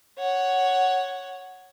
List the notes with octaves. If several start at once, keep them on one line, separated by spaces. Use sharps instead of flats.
C#5 F#5